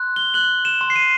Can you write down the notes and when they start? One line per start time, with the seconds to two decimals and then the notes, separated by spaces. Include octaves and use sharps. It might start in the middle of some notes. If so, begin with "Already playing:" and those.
Already playing: C6 F#6
0.16 G7
0.34 F#6 F#7
0.65 E7
0.81 C6
0.90 C7
0.96 D#7